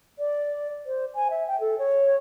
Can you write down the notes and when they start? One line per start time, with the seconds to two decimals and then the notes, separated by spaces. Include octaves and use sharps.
0.19 D5
0.86 C5
1.15 G#5
1.30 E5
1.48 G5
1.60 A4
1.79 C#5